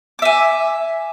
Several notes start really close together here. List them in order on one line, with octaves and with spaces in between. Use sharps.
D6 E5 G#5